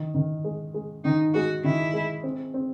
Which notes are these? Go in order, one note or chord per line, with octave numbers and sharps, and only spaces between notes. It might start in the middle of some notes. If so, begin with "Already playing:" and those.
Already playing: D#3
D#3
G#3
G#3
D#3 D#4
G#3 F#4
D#3 E4
G#3
C4
C4